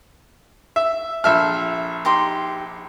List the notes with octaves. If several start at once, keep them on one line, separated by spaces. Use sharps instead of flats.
E5
A#1 A4 E5 F6
D#4 G4 C6